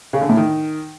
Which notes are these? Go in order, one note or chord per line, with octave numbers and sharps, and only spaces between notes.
C#3
D3
A2
D#3